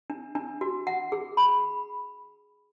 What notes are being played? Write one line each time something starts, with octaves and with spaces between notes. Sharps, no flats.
D4
D4
F#4
F#5
G#4
B5